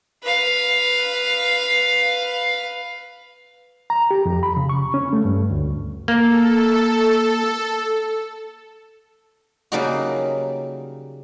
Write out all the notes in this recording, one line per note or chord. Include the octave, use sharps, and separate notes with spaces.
B4 F5
A#5
G4
F2
B5
C#3
C#6
C#4
A3
G2
D2
A#3 A4
C#3 F#3 G3 A#3 D#4 F#4